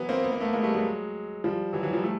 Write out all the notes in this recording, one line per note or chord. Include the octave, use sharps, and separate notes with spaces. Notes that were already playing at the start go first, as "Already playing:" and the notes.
Already playing: E3 F#3 B3
A#3 C4
B3
A#3
A3 B3
G#3 A#3
G3 A3
F#3 G#3
F3 G3
E3 F#3
E3 F#3
F3 G3
G3 A3